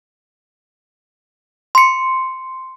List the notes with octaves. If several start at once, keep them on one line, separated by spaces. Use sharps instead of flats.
C6 C#7